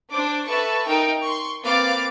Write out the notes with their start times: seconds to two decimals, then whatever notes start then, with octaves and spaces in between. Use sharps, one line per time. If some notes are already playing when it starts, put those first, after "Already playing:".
0.11 D4 C5 D6
0.47 A4 B4 E5 A5 C#6
0.87 D#4 A#4 G5
1.23 C6 C#6
1.63 A#3 C4 B4 F5 D6 A6